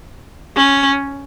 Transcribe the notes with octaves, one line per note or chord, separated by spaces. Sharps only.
C#4